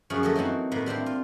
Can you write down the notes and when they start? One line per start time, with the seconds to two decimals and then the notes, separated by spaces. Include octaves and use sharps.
0.10 F#2 F3 G#4 C#5 F5 F#5
0.23 F#3 A3 A#3 A4 D#5
0.36 E3 F#3 C4 D#4 F#4
0.71 A2 A#3 B3 F#5
0.86 G3 C4 D4 E4
1.06 F4